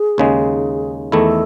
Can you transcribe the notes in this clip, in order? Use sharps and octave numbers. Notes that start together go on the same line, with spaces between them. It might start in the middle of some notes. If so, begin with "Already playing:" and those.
Already playing: G#4
D#2 C#3 G#3
E2 D#3 A3 E4 A4